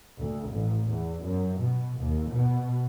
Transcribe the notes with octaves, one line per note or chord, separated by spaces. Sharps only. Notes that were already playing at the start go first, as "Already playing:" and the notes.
D2
A1
E2
F#2
B2
D#2
B2